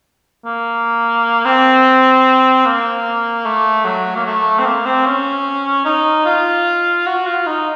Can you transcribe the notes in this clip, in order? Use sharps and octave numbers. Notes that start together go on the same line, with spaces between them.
A#3
C4
A#3
A3
F#3
A#3
A3
C4
A#3
C4
C#4
D#4
F4
F#4
F4
D#4